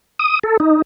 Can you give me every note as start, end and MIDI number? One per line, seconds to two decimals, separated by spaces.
0.19 0.39 87
0.43 0.57 69
0.60 0.82 63